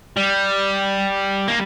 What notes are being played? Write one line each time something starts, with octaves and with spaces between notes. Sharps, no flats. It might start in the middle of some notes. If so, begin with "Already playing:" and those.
G3
A#3